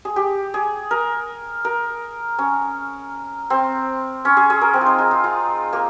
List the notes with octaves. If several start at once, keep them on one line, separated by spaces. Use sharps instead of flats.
G#4
G4
G#4
A#4
A#4
C#4
C4
C#4
G#4
G#4
A#4
C4
F4
D#4
D#4
F4
F4
A#3